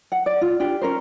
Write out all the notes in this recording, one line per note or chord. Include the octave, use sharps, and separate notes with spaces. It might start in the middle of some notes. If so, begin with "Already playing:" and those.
F#5
D5
F4
D4 F4 G4
C#4 A#4 C5